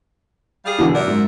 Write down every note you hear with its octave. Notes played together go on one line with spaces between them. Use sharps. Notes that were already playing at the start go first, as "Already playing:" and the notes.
G3 G#4 F5
B2 D3 E3
F#2 A#4 D5 E5
G#2